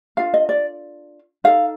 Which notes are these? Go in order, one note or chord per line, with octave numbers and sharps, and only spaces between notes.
D4 F4 A4 F5
D#5
D5
D#4 A4 F5